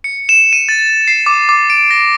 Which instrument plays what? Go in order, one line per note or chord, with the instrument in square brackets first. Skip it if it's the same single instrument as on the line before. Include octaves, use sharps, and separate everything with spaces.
[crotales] C#7
E7
D#7
A6
C7
D6
D6
D7
A#6